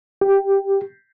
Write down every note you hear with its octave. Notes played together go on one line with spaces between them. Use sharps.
G4